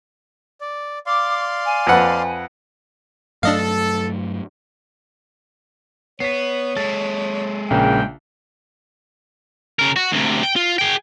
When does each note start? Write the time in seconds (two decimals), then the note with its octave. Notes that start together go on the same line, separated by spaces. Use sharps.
0.61 D5
1.07 D5 F5 C6 D6
1.65 G#5
1.87 F2 B4 F#5
3.43 G2 F#3 A3 D4 A4 D#5 F5
6.20 B3 C#5 B6 C7
6.77 G#3 A4 A6
7.71 A#1 C#3 A#3 G5
9.79 C#3 A#4
9.96 F#4
10.12 D2 C3
10.43 G5
10.56 F4
10.78 G#4 G5